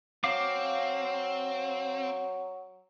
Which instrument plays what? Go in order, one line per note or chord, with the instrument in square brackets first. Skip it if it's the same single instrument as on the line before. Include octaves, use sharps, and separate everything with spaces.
[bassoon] F#3 [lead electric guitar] C4 [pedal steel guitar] F5 D6